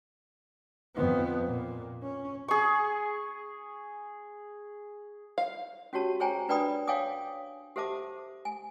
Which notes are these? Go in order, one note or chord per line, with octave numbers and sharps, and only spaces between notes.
F2 B3
A#2
C#4
G#4 C#6
F5
C#4 F#4 G4 C#5 A5
G#4 C5 C#5 G5 G#5 A#5
D4 B4 D5 G5 B5 D#6
C#5 F5 G5 G#5 D6 D#6
G4 A4 C5 E5 A5 D6
G#5